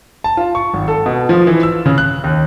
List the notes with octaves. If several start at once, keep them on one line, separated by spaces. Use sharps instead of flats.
A5
F4
C#6
G#1
A4
B2
F3
E3
E6
C#3
F#6
D#2